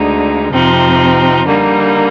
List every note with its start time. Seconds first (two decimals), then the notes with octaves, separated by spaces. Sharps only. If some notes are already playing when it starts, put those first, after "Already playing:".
Already playing: D2 D3 G#3 D#4
0.51 F2 C3 F3 C4 D#4
1.45 D3 G3 A#3 D#4